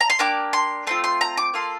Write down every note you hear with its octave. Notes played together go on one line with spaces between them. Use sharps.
A#5
C6
A#3 D4 G4 D6
C6
A3 C4 F4 C6
C6
A#5
D6
A#3 F4 A4 C6